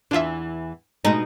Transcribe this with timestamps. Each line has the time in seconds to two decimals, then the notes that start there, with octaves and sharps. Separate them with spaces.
0.11 E2 E3 D4 F4 E5
1.05 B2 G#3 A3 D#4